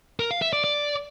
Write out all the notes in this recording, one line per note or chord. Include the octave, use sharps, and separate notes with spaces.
A#4
F5
E5
D5
D5